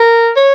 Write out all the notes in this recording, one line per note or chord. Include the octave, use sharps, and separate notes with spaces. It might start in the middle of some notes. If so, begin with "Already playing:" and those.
Already playing: A#4
C#5